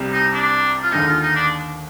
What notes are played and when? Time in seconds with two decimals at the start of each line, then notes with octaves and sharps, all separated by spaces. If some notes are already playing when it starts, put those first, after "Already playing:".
Already playing: C2 C3 G3
0.12 D#4
0.33 D4
0.83 F4
0.92 D#2 D3 G#3 D#4
1.07 F4
1.22 D#4
1.36 D4